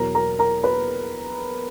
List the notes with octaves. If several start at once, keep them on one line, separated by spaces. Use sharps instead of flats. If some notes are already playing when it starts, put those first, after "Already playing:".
Already playing: E2 B2 F#3 A#4 A#5
A#4 A#5
A#4 A#5
B4 B5